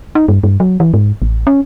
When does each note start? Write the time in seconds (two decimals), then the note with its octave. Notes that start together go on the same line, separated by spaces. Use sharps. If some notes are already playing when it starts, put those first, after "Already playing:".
0.15 D#4
0.28 G2
0.44 G2
0.60 F#3
0.80 E3
0.94 G#2
1.22 A1
1.47 C#4